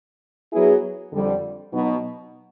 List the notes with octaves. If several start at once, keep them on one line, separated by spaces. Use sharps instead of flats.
F#3 B3 E4 G#4
F2 D3 G3
B2 F#3 B3 D#4